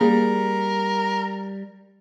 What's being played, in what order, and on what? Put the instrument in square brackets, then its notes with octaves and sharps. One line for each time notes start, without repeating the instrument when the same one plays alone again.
[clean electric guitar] G3 [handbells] A#3 G#4 [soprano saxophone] A#4